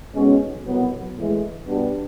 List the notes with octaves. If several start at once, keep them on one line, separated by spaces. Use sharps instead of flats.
B1 B2 G#3 C#4
C2 B2 F#3 B3
A2 E3 G#3
B2 G3 B3 D4